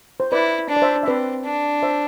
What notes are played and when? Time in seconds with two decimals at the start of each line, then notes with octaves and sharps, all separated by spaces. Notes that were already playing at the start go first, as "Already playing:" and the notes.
0.20 C5
0.32 E4 B4 D5
0.69 D4
0.77 D5
0.82 C5 E5
1.03 E5
1.07 C4 B4 D5
1.45 D4
1.83 C5 E5